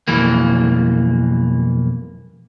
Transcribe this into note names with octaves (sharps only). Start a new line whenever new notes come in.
B1 F2 E3 A#3